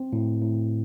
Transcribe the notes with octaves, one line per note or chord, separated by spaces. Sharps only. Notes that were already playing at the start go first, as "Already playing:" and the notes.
Already playing: C4
A2
A2